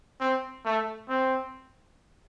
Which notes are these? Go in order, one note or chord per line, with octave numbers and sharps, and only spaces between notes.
C4
A3
C4